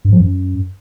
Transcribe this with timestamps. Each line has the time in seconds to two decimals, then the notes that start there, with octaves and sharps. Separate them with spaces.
0.05 G2
0.12 F3
0.20 F#2